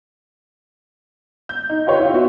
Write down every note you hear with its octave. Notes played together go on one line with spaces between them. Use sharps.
G6
D#4
F4 G4 B4 C#5 D#5 C6
E4 F4
B3 F#4 E5